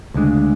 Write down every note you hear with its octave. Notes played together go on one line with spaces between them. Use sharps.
D2 C#3 G#3 D4